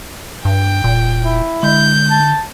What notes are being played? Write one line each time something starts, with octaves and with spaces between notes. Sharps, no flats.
G2 G5
E1 A#2
E4
D3 G#3 G6
A5